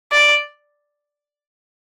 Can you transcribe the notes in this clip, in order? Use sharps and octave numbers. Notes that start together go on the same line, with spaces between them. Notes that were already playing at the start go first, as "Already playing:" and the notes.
D5